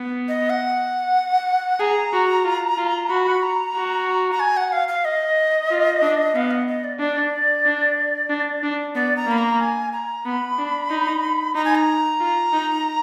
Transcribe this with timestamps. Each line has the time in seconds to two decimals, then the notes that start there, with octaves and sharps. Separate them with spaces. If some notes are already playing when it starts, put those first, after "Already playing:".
Already playing: B3
0.28 D#5
0.50 F#5
1.80 G#4 A#5
2.13 F#4
2.44 F4
2.78 F4
3.10 F#4 B5
3.43 A#5
3.75 F#4
4.32 A#5
4.40 G#5
4.57 F#5
4.72 F5
4.88 F5
5.05 D#5
5.70 F4
6.02 D4
6.35 B3 F5
6.51 D#5
6.68 D#5
6.84 D5
6.99 D4 D5
7.65 D4
8.30 D4
8.63 D4
8.95 B3 D5
9.17 A#5
9.27 A#3 B5
9.38 A#5
9.61 G#5
9.93 A#5
10.25 B3 B5
10.58 D4
10.90 D#4
11.55 D#4 A#5
11.65 G#5
11.75 A#5
12.20 F4
12.53 D#4